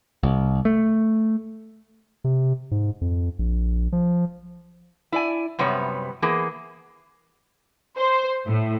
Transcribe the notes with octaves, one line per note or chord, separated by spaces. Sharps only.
C2
A3
C3
G#2
F2
A#1
F3
E4 D5 G#5
F#2 C3 G3 B3 C#5
E3 A#3 B3 G#4
C5
A2